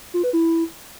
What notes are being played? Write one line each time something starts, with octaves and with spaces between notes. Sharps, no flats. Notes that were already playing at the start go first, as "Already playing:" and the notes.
F4
B4
E4